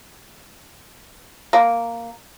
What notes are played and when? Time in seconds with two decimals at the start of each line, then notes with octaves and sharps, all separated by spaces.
1.53 A#3